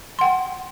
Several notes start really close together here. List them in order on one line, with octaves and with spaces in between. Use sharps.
C6 F#5 G5